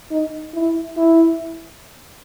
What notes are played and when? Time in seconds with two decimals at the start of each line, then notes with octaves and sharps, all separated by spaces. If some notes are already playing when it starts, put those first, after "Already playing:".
0.10 D#4
0.54 E4
0.97 E4